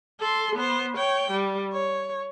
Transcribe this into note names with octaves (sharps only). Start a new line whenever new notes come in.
A4 C6
B3 C5
C#5 G5
G3
C#5